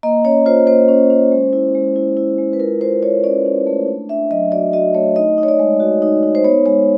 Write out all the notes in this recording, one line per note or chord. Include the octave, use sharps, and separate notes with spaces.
A#3 D#5
C#4 C#5
F4 C5
A#3 C5
C#4
C#4
G#3
E4
G#3
E4
E4
G#3
B4
F4 A#4
F4 C5
F4 C#5
C#4 D5
C#4
A3
D4
D4 E5
F#3 D#5
F#4 D5
F#4 D#5
A3 C#5
D#4 D#5
D#4
C#5
D5
G#3
F#4
D#4
D#4
C5
B3 C#5
G#3 C#5